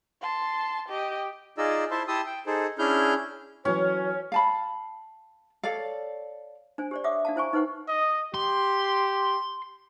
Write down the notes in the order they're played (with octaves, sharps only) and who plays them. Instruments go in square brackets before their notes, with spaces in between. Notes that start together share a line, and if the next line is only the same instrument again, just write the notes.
[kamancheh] A5 C6
G4 D#5
[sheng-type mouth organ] D#4 F4 G#4 D5 D#5 E6
E4 C5 E5 A5 C6
E4 G4 A5 C6 D#6 E6
G5
D#4 G#4 A4 C5
C#4 D4 E4 G#4 F6 G6
[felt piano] E3 F#3 [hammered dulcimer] C#4 [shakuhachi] C#5
[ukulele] F5 A5 B5
A4 C#5 D5 F5
[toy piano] D4 C5 G#5
G4 C5 D5
C#5 D5 E5 F#5 D6 D#6
D4 F5 A5
E4 C5 G#5 C#6
D#4 B4 C5 F#5 C#6
[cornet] D#5
[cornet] G4 [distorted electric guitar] C6